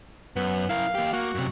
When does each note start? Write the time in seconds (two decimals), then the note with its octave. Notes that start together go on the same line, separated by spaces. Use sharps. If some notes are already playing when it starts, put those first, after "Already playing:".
0.36 F#2 B3
0.69 E4 A#4 F5
0.95 A#3 G4
1.13 A#3 F#4
1.35 F#2 C3